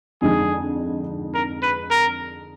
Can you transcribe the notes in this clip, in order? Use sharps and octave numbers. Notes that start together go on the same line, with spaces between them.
F2 D3 G#3 D#4 G#4
A#4
B4
A#4